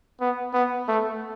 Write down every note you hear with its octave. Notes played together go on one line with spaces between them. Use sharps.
B3
B3
A3